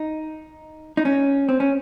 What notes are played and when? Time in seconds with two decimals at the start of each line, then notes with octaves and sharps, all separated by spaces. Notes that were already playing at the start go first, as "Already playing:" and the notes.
Already playing: D#4
0.97 D#4
1.05 C#4
1.49 C4
1.60 C#4